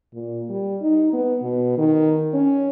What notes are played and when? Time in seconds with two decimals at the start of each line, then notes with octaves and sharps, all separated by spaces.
0.13 A#2
0.50 G3
0.81 D#4
1.13 B3
1.42 B2
1.77 D#3
2.34 C#4